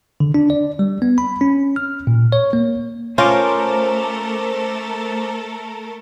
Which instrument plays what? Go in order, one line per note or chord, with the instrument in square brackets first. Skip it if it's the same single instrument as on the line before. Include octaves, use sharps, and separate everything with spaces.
[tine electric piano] D3
D4
D5
G3
B3
B5
C#4
F6
A#2
C#5
A#3
[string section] A3 A4 A#4 [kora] C#4 F4 [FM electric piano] C5 A#5 D6